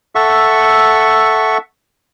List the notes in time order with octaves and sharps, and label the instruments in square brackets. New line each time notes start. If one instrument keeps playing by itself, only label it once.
[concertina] A4 E5 F#5 C#6